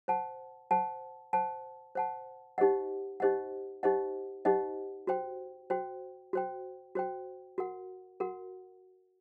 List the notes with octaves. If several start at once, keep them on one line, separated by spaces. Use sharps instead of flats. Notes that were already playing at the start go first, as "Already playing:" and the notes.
C5 F#5 A5
C5 F#5 A5
C5 F#5 A5
C5 F#5 A5
D#4 G4 C5 D#5 F#5
D#4 G4 C5 D#5 F#5
D#4 G4 C5 D#5 F#5
D#4 G4 C5 D#5 F#5
F#4 C5 G5
F#4 C5 G5
F#4 C5 G5
F#4 C5 G5
F#4 A#4 F#5
F#4 A#4 F#5